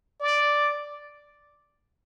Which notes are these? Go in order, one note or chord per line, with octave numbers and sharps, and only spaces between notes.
D5